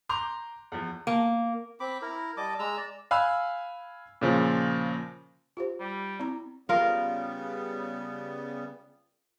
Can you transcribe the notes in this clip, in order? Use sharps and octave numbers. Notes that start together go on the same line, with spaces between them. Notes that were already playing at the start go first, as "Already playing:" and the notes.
A#5 C6 D6 G6 F7
E2 F3
A#3
C4 B5 D6
E4 A#4
G3 D#5 A5 D6
G#3 A#5 E6
D5
F5 G#5 B5 E6 F#6
A#2 C#3 F3
F4 G4 C5
G3
C4 E4 A#5
C#3 G3 B3 F4 A#4